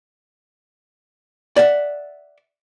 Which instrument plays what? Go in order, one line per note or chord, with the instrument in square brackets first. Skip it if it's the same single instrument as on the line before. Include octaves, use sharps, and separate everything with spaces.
[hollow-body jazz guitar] D5 E5 F#5